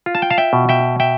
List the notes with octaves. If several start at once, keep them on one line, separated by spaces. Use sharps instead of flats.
F4
A5
G5
F5 A5
E5 G5
B2
E5 G5
E5 G5